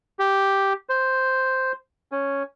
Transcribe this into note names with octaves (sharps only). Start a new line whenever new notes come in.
G4
C5
C#4